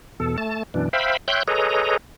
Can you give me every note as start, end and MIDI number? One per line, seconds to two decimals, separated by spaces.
0.20 0.37 40
0.20 0.37 47
0.20 0.37 69
0.38 0.63 57
0.38 0.63 81
0.74 0.89 42
0.74 0.89 47
0.74 0.89 52
0.74 0.89 62
0.93 1.17 72
0.93 1.17 76
0.93 1.17 77
0.93 1.17 79
0.93 1.17 83
1.28 1.43 73
1.28 1.43 76
1.28 1.43 79
1.28 1.43 84
1.28 1.43 90
1.28 1.43 91
1.48 1.97 68
1.48 1.97 69
1.48 1.97 71
1.48 1.97 73
1.48 1.97 75
1.48 1.97 82